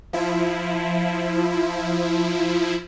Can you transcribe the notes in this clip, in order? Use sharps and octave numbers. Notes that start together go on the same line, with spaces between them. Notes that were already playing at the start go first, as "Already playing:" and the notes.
F3 E4